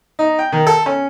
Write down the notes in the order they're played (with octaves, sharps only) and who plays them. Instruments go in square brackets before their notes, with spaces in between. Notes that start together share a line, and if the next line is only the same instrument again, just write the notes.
[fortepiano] D#4
G5
D#3
A4
C#4